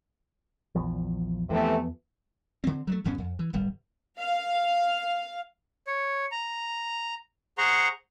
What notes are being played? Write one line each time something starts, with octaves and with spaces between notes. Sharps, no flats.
A#1 E2 F3
E2 C3 E3 F3 A3 B3
D3 C4
F#3 G#3 A3
D2 G2 B2 C#4
F2
E3
D1 G1 G3
F5
C#5
A#5
G#4 C5 F#5 A#5 C6 C#6